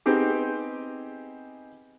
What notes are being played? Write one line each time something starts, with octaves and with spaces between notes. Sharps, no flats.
B3 C4 D#4 G4 G#4